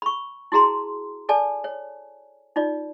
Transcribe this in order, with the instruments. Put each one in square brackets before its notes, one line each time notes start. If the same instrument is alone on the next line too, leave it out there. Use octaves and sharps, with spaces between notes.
[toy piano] B5 C#6
E4 F#4 G#4 A#5 C6
A4 D5 G#5 A5
C#5
D#4 F4 D5